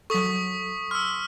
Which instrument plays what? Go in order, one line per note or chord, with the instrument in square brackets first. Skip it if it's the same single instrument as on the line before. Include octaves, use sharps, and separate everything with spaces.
[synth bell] F#3 A4 [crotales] C#6 D#6 B6
[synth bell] C6 [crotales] E6 F6